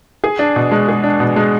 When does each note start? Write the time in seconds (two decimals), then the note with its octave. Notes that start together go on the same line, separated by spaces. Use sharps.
0.24 G#4
0.39 D4
0.56 B2
0.71 G#3
0.88 G#4
1.04 D4
1.20 B2
1.36 G#3